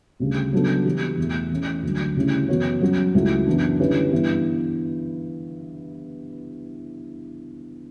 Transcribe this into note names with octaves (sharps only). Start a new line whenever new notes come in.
D2 C#3 G3
C#3 F#3 B3 D4 A4
E3 G3 B3
E2 B2 A3
E3 A3 C#4
D2 D3 F#3
D2 C#3 G3 C#4 E4
F#2 E3 B3 F#4 C#5
F#3 C#4 F#4
C#2 C#3 F#3 A3 E4
F#2 E3 B3 D4
D3 G3 C#4 E4 B4
G2 E3 B3 E4